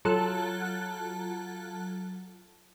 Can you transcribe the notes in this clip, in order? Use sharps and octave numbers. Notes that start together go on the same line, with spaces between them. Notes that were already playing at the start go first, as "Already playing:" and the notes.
F#3 F4 A4 A5 F#6